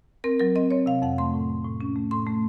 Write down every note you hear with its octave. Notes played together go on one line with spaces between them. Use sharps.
C4 A#4
F#3 A#4
C4 D#5
C4 C#5
C3 F5
F2 F#5
A3 C6
A2
A2
A2
C#4
A3
A2 C6
A3